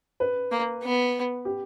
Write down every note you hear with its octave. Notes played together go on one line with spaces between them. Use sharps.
B4
A#3
B3
G4